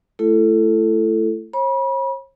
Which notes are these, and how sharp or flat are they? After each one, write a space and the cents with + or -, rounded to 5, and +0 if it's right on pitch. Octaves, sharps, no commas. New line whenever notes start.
A3 +0 E4 +35 A4 +0
C#5 -45 B5 -35